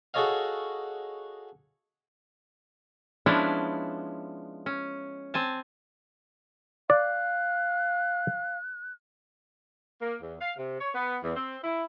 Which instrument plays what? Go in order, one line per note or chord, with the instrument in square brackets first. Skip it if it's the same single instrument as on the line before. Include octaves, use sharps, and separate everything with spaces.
[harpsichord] F#4 G#4 A4 C#5 D#5 F5
[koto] F3 G#3 B3 C#4 D4 E4
C#4
C4 G#5 A5
[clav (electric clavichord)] D5 [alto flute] F5 [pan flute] F#6
[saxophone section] A#3
E2
F5
C3
C#5
B3
E2
C4
E4